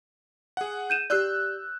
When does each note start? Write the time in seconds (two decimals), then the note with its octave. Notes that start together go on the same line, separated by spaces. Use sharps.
0.57 G#4 F#5
0.90 G6 D#7 E7
1.10 G4 D5 E6 F#6 G6